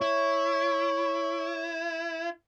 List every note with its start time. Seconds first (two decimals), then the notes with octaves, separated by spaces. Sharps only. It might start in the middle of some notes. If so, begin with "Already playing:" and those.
0.01 E4 C#5